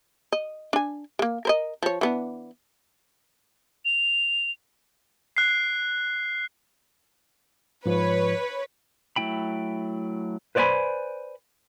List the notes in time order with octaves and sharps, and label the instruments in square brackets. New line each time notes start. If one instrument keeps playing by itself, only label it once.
[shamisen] D#5
D4 G#5
G#3 A#3
A#4 C5 D#5
F3 C#5
E3 B3 D4
[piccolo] F7
[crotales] F#6 C7
[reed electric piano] G#2 F3 [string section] B4 C#5
[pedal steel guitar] F#3 A3 E4 G5 B5
[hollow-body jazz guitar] B4 C5 D5 D#5 G#5 B5